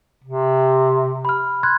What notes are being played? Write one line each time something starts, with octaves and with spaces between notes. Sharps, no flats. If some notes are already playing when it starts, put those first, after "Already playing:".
C3
B5 F6
C6 F#6 G#6